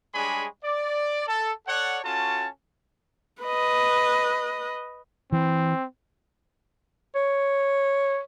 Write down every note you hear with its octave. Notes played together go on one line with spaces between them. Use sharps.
G3 G#3 D4 G#4 C#5 B5
D5
A4
A4 C#5 D5 F#5
C#4 F4 F#4 A4 A5
B4 D#5
E3 C4
C#5